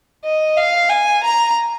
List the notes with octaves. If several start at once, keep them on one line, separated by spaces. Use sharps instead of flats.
D#5
F5
G#5
A#5